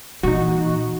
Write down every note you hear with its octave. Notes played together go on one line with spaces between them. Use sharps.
A#2 E3 D#4 F#4